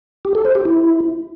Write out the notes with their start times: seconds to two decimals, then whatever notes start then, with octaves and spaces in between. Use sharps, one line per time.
0.25 G4
0.35 A4
0.45 C5
0.55 G4
0.65 E4